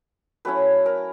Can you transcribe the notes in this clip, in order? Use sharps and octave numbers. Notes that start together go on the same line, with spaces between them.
F#3 A3 C#4 E4 B4
A#4